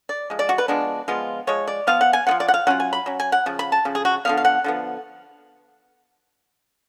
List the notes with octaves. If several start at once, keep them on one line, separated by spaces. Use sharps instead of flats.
D5
F3 G#3
D5
F#4
B4
F3 G#3 B3 D4
F3 G#3 B3 F4
F3 G#3 C#5
D5
F3 B3 F4 F5
F#5
G#5
F3 B3 F4 F#5
D5
F#5
F5
F#3 C#4 F4 F#5
G#5
B5
F#3 C#4
G#5
F#5
C#3 F3
B5
A5
C#3 F3
G#4
F#4
D3 F3 B3 F5
F5
F#5
D3 F3 B3